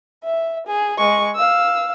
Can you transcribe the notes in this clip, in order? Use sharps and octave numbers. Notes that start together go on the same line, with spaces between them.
E5
G#4
G#3 C#6
F5 E6